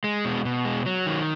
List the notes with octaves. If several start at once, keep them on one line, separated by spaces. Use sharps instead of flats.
G#3
B2
B2
G#3
F#3
D#3